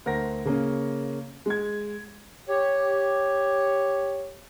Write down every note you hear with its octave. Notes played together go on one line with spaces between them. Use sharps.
D2 A#4 C5 F#5 A#6
C#3 A#3 C#4
G#3 G#6
G4 C#5